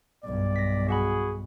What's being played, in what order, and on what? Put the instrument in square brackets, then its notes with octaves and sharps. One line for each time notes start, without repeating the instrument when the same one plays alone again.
[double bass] B1 G2 [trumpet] D5
[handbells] A#6 B6
[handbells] F#4 F#5 B5 [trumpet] G#4